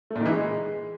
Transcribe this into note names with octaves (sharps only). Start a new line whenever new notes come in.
A3
A#2
D#3
E3
G#3